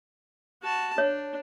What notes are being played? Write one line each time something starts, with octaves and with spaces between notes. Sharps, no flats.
F#4 A5
D4 C#5